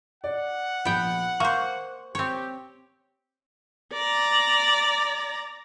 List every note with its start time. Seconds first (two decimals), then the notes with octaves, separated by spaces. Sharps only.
0.24 D5 F#5
0.85 A#1 B3 G5
1.40 A#3 C5 C#6
2.15 C4 G4 C#5
3.93 D5 A#5